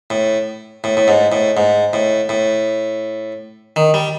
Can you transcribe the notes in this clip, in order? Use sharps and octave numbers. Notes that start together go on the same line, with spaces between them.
A2
A2
A2
G#2
A2
G#2
A2
A2
D#3
G3